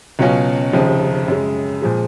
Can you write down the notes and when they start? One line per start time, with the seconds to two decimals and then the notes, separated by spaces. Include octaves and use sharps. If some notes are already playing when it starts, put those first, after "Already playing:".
0.19 C#2 B2 F#3 C#4 F4
0.73 F1 D#2 C#3 F3
1.28 F#2 C#3 G#3
1.82 A#2 F3 G#3